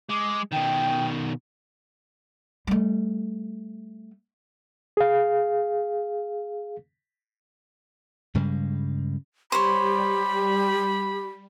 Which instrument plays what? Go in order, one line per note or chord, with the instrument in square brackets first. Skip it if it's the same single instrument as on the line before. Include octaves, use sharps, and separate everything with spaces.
[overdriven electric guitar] G#3 [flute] D6
[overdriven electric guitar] B2 D#3 [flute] G5
[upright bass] G3 A3
[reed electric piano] G#4 F5
[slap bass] G2 C#3 G3 G#3
[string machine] G3 [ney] G4 [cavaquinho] C5 C#5 [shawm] B5